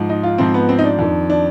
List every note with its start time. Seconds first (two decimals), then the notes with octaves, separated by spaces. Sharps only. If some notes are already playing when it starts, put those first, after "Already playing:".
Already playing: G#2 F3
0.09 D#4
0.23 F4
0.38 G#2 F3 C4
0.54 B3
0.69 C4
0.79 D#4
0.84 D4
0.99 F2 D#3
1.30 D4